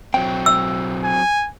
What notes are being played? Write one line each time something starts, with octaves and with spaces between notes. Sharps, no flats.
B1 F#3 C4 G5
E6
G#5